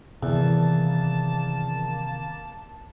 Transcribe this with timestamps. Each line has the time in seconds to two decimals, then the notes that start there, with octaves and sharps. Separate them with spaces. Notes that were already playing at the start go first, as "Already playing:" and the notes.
0.23 E2 C3 D#3 A#3 A5